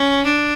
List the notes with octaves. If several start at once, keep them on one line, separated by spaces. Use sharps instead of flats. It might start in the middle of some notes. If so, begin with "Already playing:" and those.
Already playing: C#4
D4